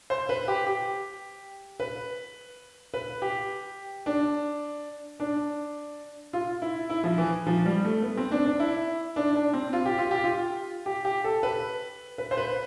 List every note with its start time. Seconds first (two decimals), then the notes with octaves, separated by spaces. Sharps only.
0.10 C5
0.29 B4
0.48 G4
0.67 G4
1.80 B4
2.94 B4
3.22 G4
4.06 D4
5.20 D4
6.33 F4
6.62 E4
6.90 E4
7.04 F3
7.18 E3
7.47 F3
7.66 G3
7.85 A3
8.03 B3
8.17 C4
8.32 D4
8.46 D4
8.60 E4
9.16 D4
9.36 D4
9.54 C4
9.73 F4
9.86 G4
9.98 F4
10.11 G4
10.24 F4
10.86 G4
11.05 G4
11.24 A4
11.43 B4
12.18 B4
12.31 C5
12.37 B4